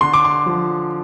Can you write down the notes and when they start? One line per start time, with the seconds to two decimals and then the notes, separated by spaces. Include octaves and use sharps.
0.01 D3 C6
0.14 D6
0.25 C6
0.46 F3